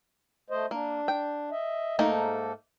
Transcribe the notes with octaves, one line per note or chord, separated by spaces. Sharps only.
A3 C5 D#5
A#3 D4
G5
D#5 E5
G#2 A3 A#3 D#4 A4